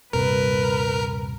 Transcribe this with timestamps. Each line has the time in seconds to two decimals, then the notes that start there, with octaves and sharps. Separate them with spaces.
0.13 D#1 G2 C3 A#4 B4